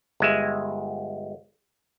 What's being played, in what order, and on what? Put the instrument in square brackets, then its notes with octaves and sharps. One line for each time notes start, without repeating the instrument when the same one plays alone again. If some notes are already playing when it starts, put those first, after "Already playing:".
[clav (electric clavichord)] G1 G#3 E5